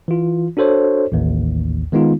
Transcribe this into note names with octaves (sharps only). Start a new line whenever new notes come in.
E3 F4
D4 F#4 A4 C5 C#5
A1 D#2
D#3 G#3 B3 D#4 F4